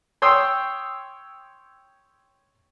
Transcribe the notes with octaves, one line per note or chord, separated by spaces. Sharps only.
C#5 G5 C6 D#6 E6